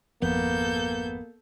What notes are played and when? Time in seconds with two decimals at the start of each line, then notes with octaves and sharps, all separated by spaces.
0.22 G#1 F2 F3 A#3 B3 A4 G6